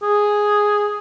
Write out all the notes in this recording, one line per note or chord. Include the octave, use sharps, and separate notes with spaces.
G#4